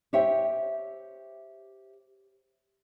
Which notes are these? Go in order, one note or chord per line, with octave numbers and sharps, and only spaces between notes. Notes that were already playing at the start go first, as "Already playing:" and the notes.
G4 C5 C#5 E5 G5